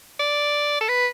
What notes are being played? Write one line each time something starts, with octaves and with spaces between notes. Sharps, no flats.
D5
A4
B4